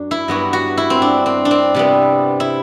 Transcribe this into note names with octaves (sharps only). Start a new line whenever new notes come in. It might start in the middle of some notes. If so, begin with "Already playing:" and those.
Already playing: F#2 D4
E4
G2 F#3 B3 F#4
F#4
E4
C4
D4
C4
D4
C4
C3 G3 B3
E4